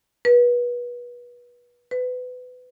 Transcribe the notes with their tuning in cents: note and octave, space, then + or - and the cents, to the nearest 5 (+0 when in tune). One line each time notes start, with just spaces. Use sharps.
B4 -30
B4 +25